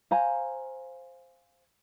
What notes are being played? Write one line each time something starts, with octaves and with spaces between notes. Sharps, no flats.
C5 F5 G#5 A#5